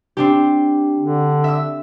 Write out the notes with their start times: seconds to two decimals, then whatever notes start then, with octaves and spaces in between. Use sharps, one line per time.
0.17 C4 D4 G4
0.99 D3
1.44 E5 E6